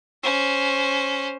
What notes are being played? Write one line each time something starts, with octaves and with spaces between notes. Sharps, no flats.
C#4 C5